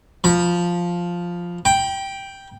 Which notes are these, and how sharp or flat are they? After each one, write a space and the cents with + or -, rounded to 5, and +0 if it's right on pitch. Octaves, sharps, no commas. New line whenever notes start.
F3 +0 B5 -35
G5 +0 B5 -45